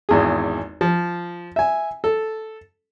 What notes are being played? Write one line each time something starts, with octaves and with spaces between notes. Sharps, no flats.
G#1 E2 G#4
F3
E5 G#5
A4